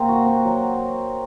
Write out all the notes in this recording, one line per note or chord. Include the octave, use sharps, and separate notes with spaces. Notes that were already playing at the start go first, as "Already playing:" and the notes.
Already playing: C3 A#3 C4
F#4
C4
F#3